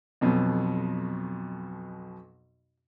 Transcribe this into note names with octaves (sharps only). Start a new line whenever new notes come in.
B1 F2 B2 F#3